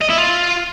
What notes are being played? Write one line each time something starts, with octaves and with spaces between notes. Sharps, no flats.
D#5
E4
F4